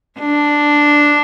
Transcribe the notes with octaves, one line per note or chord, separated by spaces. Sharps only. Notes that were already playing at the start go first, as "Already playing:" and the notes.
D4